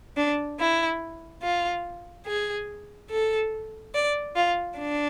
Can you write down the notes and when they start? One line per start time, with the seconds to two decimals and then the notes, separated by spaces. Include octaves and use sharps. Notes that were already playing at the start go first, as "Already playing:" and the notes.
0.17 D4
0.59 E4
1.42 F4
2.27 G#4
3.10 A4
3.94 D5
4.36 F4
4.78 D4